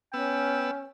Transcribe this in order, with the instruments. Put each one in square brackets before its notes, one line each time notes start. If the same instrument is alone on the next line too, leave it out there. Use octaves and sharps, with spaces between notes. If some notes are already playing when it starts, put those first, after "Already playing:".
[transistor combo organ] B3 E6 [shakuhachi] C#4 [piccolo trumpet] G5